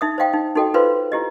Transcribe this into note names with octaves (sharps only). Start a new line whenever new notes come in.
D#4 E5 D#6
C5 D#5 F5 G5
D#4
D#4 F#4 A4 D#5 G5
F4 B4 C5 F5 C6
E4 G4 D#5